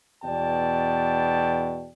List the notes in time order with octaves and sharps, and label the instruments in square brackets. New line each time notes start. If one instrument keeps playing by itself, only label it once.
[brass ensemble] E2 B2 D5 G5 A5